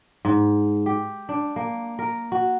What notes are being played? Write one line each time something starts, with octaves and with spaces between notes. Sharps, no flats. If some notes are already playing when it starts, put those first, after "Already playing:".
G#2
G4
D4
A#3
A#4
F#4